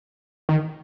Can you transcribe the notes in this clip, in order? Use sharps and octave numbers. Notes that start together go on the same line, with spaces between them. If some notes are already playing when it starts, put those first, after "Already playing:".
D#3